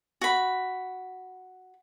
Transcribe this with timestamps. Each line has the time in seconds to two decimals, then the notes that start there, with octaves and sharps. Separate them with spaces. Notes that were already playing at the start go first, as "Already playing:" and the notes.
0.21 F#4 B5